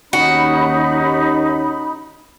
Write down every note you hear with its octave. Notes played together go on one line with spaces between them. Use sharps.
D#2 C#4 D#4 F#4 B5